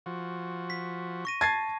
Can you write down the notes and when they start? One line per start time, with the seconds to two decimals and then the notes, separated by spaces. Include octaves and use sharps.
0.06 F3 F#4
0.70 B6
1.25 C#6 A#6 D#7
1.41 A5 G#6 A6 C7